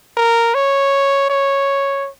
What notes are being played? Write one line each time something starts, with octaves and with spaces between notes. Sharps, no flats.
A#4
C#5
C#5